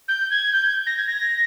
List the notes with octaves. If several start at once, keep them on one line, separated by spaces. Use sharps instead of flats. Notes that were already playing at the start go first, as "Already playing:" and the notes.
G6
G#6
G6
A#6
G#6
A#6